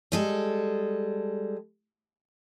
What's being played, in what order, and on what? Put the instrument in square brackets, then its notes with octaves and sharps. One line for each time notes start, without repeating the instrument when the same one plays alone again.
[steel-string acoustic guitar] G3 G#3 A4